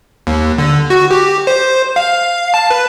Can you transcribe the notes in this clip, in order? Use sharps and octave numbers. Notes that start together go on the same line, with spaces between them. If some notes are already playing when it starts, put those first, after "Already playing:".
D#2
D3
F#4
G4
C5
F5
A5
B4